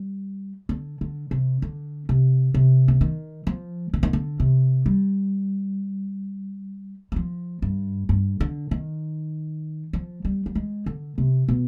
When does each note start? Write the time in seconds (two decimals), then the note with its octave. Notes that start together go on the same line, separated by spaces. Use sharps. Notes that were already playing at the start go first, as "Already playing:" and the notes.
Already playing: G3
0.69 D3
1.01 D3
1.31 C3
1.62 D3
2.09 C3
2.54 C3
2.88 D3
3.01 D#3
3.47 F3
3.93 D3
4.03 D#3
4.13 D3
4.40 C3
4.86 G3
7.12 G3
7.16 F3
7.62 G2
8.09 G2
8.40 D3
8.71 D#3
9.93 F3
10.25 G3
10.46 G3
10.55 G#3
10.86 D3
11.18 C3
11.48 B2